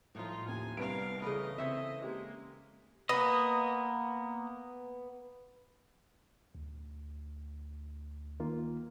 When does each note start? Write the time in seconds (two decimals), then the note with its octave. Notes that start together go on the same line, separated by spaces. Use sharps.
0.15 A2 F3 D#4 F4
0.49 D#2 G#5
0.77 C2 G2 B3 A#4 F5 D7
1.22 C#3 E3 A3 B4 D#5
1.58 C#3 C4 C#5 E5 B6
2.02 G#3 A#3 G4
3.09 A#3 B3 D#5
6.55 D2
8.40 D#3 A#3 F4